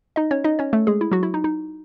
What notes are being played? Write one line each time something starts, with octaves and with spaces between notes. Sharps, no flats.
D#4 D#5
C#4 C#5
D#4 D#5
C#4 C#5
A3 A4
G#3 G#4
E4
F#3 F#4
E4
D#4
D#4